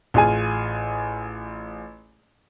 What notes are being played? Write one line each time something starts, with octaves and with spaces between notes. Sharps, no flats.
A1 F4 G#4 G#5